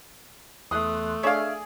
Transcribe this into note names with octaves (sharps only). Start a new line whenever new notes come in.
E2 A3 C6 D#6 F#6
D4 G#4 C#5 D5 E5 F5